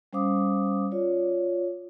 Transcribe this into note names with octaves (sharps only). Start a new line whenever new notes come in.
G3 C#4 C5 F5 D6 D#6
F4 C#5 D5